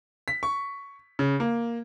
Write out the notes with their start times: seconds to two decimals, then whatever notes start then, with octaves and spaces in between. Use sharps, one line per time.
0.28 B6
0.43 C#6
1.19 C#3
1.40 A#3